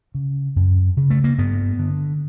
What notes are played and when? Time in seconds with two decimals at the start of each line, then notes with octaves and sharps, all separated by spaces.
0.14 C#3
0.56 F#2
0.97 C#3
1.10 A3
1.24 A#3
1.38 G2 B3
1.79 D3